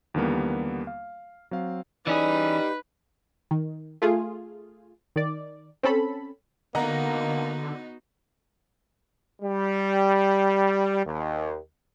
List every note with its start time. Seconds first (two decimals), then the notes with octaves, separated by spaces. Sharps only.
0.14 D#2 D3 E3 G3 A#3 B3
0.87 F5
1.51 F#3 C4 F5
2.07 E3 C#4 D#4 G4 G#4 B4 D5
3.51 D#3
4.02 A3 F4 G#4
5.16 D#3 D5
5.83 C4 C#4 A4 B5
6.75 D3 A#3 B3 D#4 F#4 D#5 F#5 A#5
9.41 G3
11.04 D#2